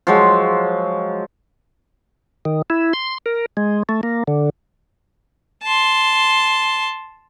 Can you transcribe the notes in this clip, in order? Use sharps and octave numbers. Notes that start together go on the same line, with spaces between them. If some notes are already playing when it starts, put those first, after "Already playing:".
F3 F#3 G#3
D#3
E4
C6
A#4
G#3
A3
A#3
D3
A5 C6